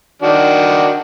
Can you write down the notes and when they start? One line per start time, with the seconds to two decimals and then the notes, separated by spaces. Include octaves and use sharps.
0.22 D#3 D4 F#4